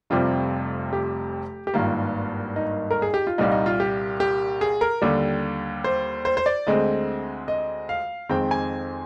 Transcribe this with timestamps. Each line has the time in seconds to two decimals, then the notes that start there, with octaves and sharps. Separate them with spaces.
0.10 F1 F2 C3 G3 C4 F4
0.93 G4
1.67 G4
1.74 G#1 G2 D#3 A#3 F4
2.56 D#4
2.91 A#4
3.02 G#4
3.14 G4
3.27 F4
3.38 C2 A#2 G3 A#3 D#4
3.52 D#4
3.66 F4
3.80 G4
4.20 G4
4.61 G#4
4.81 A#4
5.02 D#2 D3 G3
5.84 C5
6.25 C5
6.37 C5
6.46 D5
6.67 D2 D3 G#3 C4 D#5
7.48 D#5
7.89 F5
8.29 F2 D#3 G#3 C4 G5
8.51 G#5